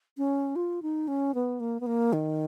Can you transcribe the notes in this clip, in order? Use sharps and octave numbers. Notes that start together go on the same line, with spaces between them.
C#4
F4
D#4
C#4
B3
A#3
B3
A#3
D#3